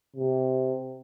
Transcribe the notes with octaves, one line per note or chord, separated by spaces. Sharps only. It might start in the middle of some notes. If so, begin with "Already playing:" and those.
C3